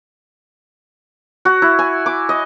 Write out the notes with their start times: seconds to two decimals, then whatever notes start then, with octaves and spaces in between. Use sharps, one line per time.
1.45 F#4
1.62 E4
1.79 G#5
2.06 D6
2.29 D#5